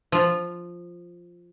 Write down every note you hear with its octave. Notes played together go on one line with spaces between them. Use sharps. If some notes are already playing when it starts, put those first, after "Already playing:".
F3 F4